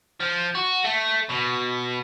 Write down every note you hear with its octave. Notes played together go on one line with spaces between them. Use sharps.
F3
F#4
A3
B2